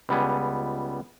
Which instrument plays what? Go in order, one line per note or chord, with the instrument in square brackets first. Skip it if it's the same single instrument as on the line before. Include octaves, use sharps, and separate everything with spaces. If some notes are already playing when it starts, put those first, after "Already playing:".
[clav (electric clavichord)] C#2 G3 B3 G#5